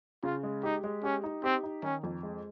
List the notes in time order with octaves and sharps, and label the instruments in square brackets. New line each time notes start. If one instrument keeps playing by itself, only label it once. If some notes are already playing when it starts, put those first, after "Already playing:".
[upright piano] C#3 [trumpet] F4
[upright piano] G#3
[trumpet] D#4 [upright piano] G4
[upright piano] G#3
[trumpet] C#4 [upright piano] G4
[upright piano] D#4
[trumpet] C4 [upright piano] G4
[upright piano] D#4
[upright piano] D#3 [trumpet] C#4
[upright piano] F2
G#3